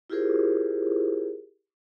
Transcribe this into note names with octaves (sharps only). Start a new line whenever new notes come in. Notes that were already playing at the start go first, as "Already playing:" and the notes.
E4 F4 G4 G#4 A#4 C5